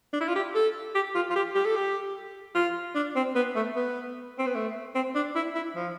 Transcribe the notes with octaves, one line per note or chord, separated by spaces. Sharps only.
D4
E4
F4
G4
A4
G4
F4
F4
G4
G4
A4
G4
F4
D4
C4
B3
A3
B3
C4
B3
A3
C4
D4
E4
E4
F3